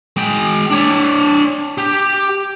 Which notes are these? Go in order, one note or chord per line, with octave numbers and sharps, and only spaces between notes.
G#3 G5
D4 C#5
G4